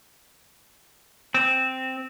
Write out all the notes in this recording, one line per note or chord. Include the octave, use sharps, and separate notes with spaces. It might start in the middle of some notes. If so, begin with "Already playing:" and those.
C4